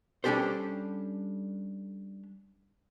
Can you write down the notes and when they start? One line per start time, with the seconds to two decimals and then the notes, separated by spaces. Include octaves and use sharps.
0.24 G3 C#4 D4 G4 A4 C5